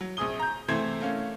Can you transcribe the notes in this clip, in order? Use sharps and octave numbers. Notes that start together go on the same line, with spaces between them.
F#3
A#1 C3 G#4 D#6 G7
A#5 G6
C3 E3 A3 C4 C5 G#6
A3 A#3 C#4